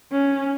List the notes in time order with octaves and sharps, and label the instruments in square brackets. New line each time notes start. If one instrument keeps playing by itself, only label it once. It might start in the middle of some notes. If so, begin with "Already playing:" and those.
[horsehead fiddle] C#4